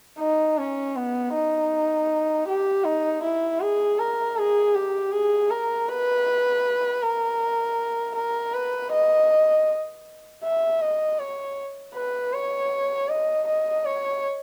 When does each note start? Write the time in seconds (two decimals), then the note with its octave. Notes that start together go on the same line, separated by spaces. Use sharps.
0.19 D#4
0.58 C#4
0.96 B3
1.33 D#4
2.48 G4
2.85 D#4
3.23 E4
3.60 G#4
3.99 A#4
4.37 G#4
4.75 G4
5.12 G#4
5.50 A#4
5.88 B4
7.02 A#4
8.16 A#4
8.54 B4
8.92 D#5
10.44 E5
10.81 D#5
11.19 C#5
11.94 B4
12.33 C#5
13.09 D#5
13.47 D#5
13.85 C#5